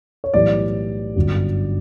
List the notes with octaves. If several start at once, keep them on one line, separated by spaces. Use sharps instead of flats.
C#5
B1 A2 E3 G3 D5
G1 F#2 D3 F#3